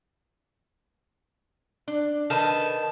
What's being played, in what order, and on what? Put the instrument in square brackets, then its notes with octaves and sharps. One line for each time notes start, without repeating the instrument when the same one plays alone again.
[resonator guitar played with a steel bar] D4
[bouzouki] D#3 A5 [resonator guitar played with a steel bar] A4 B4